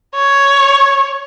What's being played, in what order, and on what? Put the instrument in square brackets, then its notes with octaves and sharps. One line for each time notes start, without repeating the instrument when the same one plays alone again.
[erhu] C#5